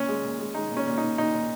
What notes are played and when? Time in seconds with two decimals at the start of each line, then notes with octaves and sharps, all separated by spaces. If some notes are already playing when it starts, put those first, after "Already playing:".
Already playing: A#2 C#4
0.08 G#3
0.24 A#2
0.39 G#3
0.55 G#3 D#4
0.71 A#2
0.77 C#4
0.87 A#2
0.98 D#4
1.03 A#2
1.18 A#2 D#4
1.34 A#2